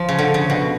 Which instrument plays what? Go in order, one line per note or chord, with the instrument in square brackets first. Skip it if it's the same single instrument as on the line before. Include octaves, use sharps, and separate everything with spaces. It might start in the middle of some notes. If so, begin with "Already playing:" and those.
Already playing: [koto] F3
C#3
D3
C#3
B2